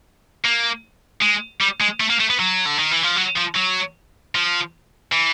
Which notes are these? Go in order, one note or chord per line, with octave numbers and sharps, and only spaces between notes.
A#3
G#3
G3
G#3
A3
A#3
A3
B3
F#3
D3
D#3
E3
F3
F#3
F3
F#3
F3
E3